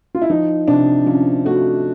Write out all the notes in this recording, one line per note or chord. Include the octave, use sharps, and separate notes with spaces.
F4
E4
F3 D#4
C3 D4
F3 C#4
A3 F#4